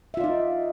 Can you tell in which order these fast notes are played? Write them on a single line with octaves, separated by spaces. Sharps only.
E5 F4 D5 D#4